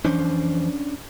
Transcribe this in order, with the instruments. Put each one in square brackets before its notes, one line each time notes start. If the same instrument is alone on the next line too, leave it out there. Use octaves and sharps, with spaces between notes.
[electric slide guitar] F2 E3 C5 [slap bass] C#4 D4